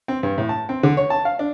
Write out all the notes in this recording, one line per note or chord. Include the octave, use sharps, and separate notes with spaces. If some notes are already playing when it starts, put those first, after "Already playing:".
C4
G2
A2
A5
C4
D3
C#5
A5
F5
D4